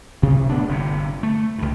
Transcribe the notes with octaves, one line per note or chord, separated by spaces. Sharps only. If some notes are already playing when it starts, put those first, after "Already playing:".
D2 C3
A2 B3 D4
G1 G2 C3
A3
C#2 G2